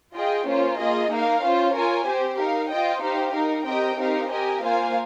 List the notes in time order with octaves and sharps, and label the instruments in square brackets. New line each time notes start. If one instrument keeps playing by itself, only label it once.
[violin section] F4 G#4 D#5 G5
A#3 C#4 F4 C5
A#3 F4 G#4 D#5
A#3 D#4 A#4 F5
C#4 F4 C5
F4 A#4 C#5 G#5
C4 G4 C5
D#4 A#4 F5
F4 C5 D#5 G5
D#4 G4 C5 F5
D#4 A#4 F5
C4 G4 A#4 D#5 G5
C4 D#4 G4 A#4 F5
G4 A#4 D#5 G#5
A#3 F4 C5 F5 G#5